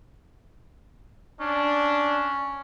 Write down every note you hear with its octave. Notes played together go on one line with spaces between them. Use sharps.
C#4 D4